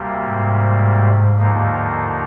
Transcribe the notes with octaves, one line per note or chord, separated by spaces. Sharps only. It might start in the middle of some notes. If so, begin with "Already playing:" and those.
Already playing: D2 C3 G3 A#3
G#2
D#2 D3 F3 A#3 D#4